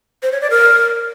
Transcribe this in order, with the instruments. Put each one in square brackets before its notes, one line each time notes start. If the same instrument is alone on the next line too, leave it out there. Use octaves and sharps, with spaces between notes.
[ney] C5
C#5
D5
A#4